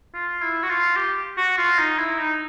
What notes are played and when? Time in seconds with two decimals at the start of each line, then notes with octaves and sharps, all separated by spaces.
0.14 F4
0.42 E4
0.63 F#4
0.69 F4
0.96 G4
1.37 F#4
1.58 F4
1.78 D#4
1.99 E4
2.19 D#4